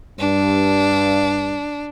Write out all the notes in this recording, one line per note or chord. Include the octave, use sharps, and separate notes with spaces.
G2 D4